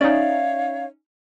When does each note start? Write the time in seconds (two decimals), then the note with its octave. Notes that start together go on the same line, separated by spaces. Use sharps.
0.01 C#4 D#4 C#5 D5 E5 F5